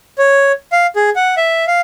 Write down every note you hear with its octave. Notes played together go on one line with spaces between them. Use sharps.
C#5
F5
G#4
F#5
E5
F5